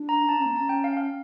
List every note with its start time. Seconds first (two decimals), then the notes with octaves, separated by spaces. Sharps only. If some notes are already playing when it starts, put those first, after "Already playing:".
Already playing: D4
0.09 A#5
0.29 D4 A5
0.38 C#4
0.42 A#3 A#5
0.55 C#4 A5
0.69 G5
0.84 F5
0.97 F5